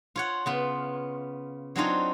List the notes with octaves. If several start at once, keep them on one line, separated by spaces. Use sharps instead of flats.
F4 C#5 F#5
C#3 B3 F4
F#3 C4 D4 D#4 F4 C#5